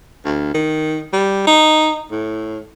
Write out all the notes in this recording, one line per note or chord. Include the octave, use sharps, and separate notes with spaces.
D2
D#3
G3
D#4
A2